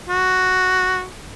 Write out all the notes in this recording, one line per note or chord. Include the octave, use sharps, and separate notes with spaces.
F#4